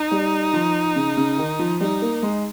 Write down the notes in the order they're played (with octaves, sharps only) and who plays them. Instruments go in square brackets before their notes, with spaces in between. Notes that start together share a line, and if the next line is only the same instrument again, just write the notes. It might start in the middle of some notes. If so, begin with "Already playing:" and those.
Already playing: [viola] D#4
[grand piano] G3
F3
C#3
C#3
D#3
F3
[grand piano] G3 [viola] D#4
[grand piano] A#3
G#3